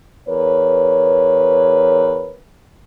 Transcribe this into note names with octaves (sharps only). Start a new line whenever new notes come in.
E2 A#4 B4 C#5